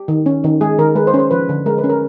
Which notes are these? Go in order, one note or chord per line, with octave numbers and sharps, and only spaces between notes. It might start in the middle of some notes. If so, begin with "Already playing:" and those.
Already playing: G4
D#3
C#4
D#3
G#3 G#4
D#3 A#4
G#3 B4
C5
C#4
C5
F3 B4
D3
G#3 A#4
B4
C#4
A#4